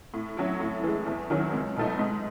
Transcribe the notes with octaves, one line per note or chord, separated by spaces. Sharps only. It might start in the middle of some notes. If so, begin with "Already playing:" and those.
A2
F#3 C#4 E4
A2
E3 G#3
E2
D#3 F#3 C#4 E4
C#2
B2 F#3 A3 D#4
G#2